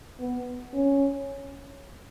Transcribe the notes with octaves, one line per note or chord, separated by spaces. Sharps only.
B3
C#4